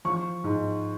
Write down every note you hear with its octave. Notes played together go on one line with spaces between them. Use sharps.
F3 C#6
G#2